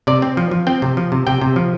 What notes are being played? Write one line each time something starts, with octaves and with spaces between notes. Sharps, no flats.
C3 D5
C4
F3
F3
C4 G5
C3
F3
C3
C3 G5
C3
F3